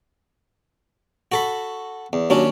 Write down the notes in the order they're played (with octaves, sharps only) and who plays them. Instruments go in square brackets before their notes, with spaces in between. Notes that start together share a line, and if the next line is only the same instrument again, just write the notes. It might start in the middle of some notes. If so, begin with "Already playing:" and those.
[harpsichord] F#4 A4 B5
E2
[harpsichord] D#2 C#4 D4 [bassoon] F#3